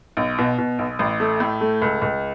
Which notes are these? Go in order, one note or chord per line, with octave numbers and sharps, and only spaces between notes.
B1
B2
B2
B1
A1
A3
A2
A3
C#2
C#2